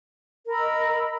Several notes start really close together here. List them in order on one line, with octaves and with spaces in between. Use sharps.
A#4 B5 E6 D#5